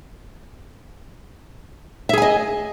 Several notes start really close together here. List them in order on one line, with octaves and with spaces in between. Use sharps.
E5 G#4 G#5 D#5